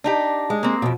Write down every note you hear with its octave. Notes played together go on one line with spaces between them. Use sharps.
D4 D#4 G4
G#3
A#3 C4
F2 B2